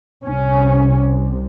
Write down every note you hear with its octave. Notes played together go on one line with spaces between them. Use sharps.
C2 C3 C#4